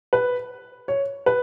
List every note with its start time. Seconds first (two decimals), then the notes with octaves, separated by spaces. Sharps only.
0.13 B4
0.88 C#5
1.26 B4